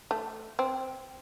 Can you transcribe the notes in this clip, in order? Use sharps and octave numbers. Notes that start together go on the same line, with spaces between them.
A3
C4